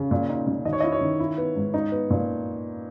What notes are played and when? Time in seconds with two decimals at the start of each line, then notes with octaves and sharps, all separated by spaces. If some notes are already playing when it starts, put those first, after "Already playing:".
Already playing: C#3
0.11 A#2
0.29 D#4
0.47 A#2
0.65 D#3 D#5
0.73 C#5
0.80 E4 D#5
0.92 C#5
1.01 D#3
1.20 E4
1.38 B3
1.56 G#2
1.74 D#4
1.92 B3
2.10 A#2